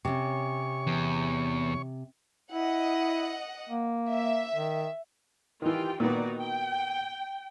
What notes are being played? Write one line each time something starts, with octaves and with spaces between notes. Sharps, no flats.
C3 C#4 C#5 C#6
E2
E4 D#5 F#5
A#3
E5
D#3
D#3 E3 F4 G4 G5
A#2 D#3 B3 D#4 F#4 D5
G5